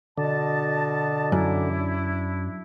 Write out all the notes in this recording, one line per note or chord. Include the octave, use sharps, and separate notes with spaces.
B2 D3 D#5 A5
F#2 D4 E4